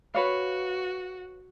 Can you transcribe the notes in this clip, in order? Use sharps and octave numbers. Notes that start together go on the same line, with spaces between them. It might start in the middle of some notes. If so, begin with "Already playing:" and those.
F#4 B4 C#5 F5